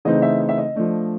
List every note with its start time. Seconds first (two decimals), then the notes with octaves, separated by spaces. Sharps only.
0.05 C#3 E3 A3 C4 D#4 D#5
0.22 E5
0.49 E5
0.58 D#5
0.75 F3 A3 D4